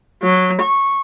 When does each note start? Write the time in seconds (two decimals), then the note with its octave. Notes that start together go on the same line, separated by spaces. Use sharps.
0.22 F#3
0.62 C#6